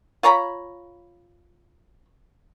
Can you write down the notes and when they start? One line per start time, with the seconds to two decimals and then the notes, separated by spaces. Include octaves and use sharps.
0.23 F4 C#5 A#5 B5